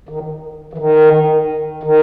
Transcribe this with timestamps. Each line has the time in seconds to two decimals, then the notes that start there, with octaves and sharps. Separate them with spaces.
0.09 D#3
0.73 E3
0.78 D#3
1.83 D#3